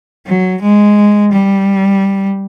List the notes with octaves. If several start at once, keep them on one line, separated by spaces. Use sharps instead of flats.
F#3
G#3
G3